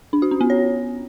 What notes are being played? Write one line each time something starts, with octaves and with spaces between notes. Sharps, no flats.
D4
F#4
C#4
B3
C#5